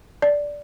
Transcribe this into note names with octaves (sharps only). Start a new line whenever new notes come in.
D5